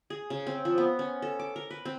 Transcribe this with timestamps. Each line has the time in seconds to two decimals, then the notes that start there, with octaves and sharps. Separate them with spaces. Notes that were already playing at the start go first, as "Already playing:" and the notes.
0.10 G#4
0.30 C#3
0.47 C4
0.65 F3
0.78 B3
0.99 C#4
1.22 A4
1.39 D6
1.56 A#4
1.70 B4
1.85 C4